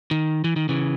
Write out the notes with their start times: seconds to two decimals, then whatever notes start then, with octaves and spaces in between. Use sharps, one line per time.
0.11 D#3
0.44 E3
0.56 D#3
0.69 C#3 E3